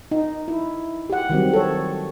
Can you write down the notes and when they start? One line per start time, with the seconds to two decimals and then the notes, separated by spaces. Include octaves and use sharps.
0.11 D#4
0.48 E4
1.10 G4 F#5
1.30 D#3 F#3 G3 C4
1.53 A4 C#5